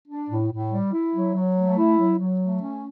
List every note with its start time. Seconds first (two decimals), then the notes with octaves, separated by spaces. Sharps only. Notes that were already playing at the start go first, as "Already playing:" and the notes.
0.08 D4
0.29 A2
0.51 A2
0.71 G3
0.93 E4
1.14 F#3
1.35 F#3
1.57 A3
1.77 E4
1.98 F#3
2.19 F#3
2.40 A3
2.61 C#4